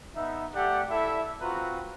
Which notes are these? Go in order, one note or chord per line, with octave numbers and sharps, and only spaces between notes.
B3 D#4 E5
A3 G4 D5 F#5
E4 A4 D5 E5
C4 F4 F#4 B4 A#5